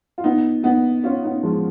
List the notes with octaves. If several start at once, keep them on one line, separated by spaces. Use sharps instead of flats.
F4
B3 D#4
B3 D#4
C#4 F4
B3 D#4
F3 G#3